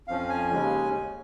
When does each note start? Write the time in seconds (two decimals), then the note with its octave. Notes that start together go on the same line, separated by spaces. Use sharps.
0.08 F2 F3 C#4 F5
0.29 G#5
0.51 D#2 C#3 G#3 C#4